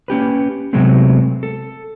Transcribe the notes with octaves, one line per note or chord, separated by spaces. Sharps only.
A#3 C#4 G4 B4
C3 F#3 G#3 A3 B3 C4
A4